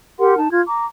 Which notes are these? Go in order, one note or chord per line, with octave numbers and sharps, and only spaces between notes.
G4 A#4 F#5 C6
D#4 A5
F4 G#6
A#5 D6